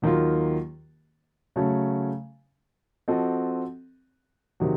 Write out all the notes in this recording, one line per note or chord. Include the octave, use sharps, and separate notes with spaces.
D#2 D#3 F#3 A#3 F4
C#3 F#3 A3 C#4
F3 C4 F#4 A4 D#5
C3 D#3 F#3